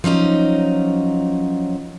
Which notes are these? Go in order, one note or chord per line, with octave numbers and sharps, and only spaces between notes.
F3 F#3 C#4 D#4